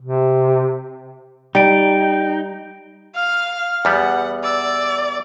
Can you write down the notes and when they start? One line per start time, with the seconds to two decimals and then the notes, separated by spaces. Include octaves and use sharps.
0.02 C3
1.55 G3 D#4 G5 D7
3.16 F5 F6
3.85 E2 G3 B3 F#5
4.44 D5 E6